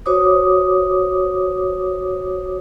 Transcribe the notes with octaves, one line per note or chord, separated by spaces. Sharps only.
F#4 C5 C#5 D6 D#6